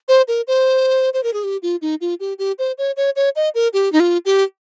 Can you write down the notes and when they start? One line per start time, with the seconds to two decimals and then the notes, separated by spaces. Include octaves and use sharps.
0.08 C5
0.28 A#4
0.48 C5
1.14 C5
1.23 A#4
1.33 G#4
1.44 G4
1.63 F4
1.82 D#4
2.01 F4
2.20 G4
2.39 G4
2.59 C5
2.78 C#5
2.97 C#5
3.16 C#5
3.36 D#5
3.55 A#4
3.73 G4
3.92 D#4
4.00 F4
4.25 G4